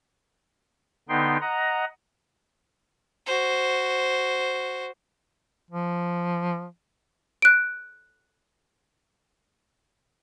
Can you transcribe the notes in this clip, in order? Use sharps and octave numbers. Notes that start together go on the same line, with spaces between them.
D3 B3 D#4 G5 C6
D#5 F#5 A#5
F#4 C5
F3
F#6 D7